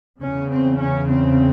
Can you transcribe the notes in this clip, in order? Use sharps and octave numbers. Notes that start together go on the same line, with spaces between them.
E2 C#3 C#4
C4
C#4
C4